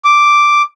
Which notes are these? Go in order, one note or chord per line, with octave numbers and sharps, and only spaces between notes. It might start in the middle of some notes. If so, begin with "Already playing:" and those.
D6